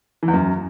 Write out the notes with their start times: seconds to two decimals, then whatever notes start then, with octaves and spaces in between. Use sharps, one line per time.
0.23 E3
0.28 E2
0.34 F#2